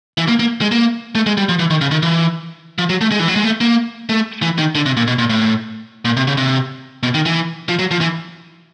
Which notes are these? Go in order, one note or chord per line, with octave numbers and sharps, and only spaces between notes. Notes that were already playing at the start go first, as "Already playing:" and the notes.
E3
A#3
A#3
G#3
A#3
A3
G#3
G3
F3
E3
D#3
C#3
D#3
E3
F3
F#3
A3
G#3
E3
F#3
G#3
A3
A#3
A3
E3
D#3
D3
C3
A#2
B2
A#2
A2
A#2
C3
C#3
C3
B2
D#3
E3
F3
F#3
F3
E3